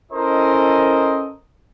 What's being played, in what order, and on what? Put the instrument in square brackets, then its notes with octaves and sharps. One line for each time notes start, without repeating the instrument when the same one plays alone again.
[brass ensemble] C#4 E4 A4 A#4 C5 D#5